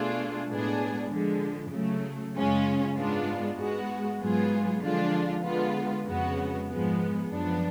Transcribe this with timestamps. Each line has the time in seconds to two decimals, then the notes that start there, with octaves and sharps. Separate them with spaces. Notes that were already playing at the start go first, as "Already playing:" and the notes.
Already playing: B2 A3 D4 F4 G#4
0.48 A2 G#3 B3 D4 G#4
1.11 D3 F3 G#3
1.72 C#3 F#3 A3
2.35 F#2 C#3 G#3 C#4 F4
2.96 G#2 G#3 B3 D4 F4
3.58 G#2 G#3 B3 F#4
4.20 G#2 F#3 B3 F4 G#4
4.82 D3 F3 G#3 D4 F4
5.44 D3 G#3 B3 F4
6.05 F2 C#3 G#3 B3 F#4
6.68 G#2 F3 G#3 B3
7.29 F#2 F3 B3 D4